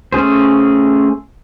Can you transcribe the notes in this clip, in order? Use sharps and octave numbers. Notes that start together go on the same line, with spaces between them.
A3 C#4 G#4 C5